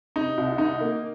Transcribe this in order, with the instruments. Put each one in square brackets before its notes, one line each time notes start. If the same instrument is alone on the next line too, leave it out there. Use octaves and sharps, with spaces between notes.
[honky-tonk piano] C3 [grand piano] D#4
[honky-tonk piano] C2
[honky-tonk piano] D#3 [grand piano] D#4
[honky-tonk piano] A#3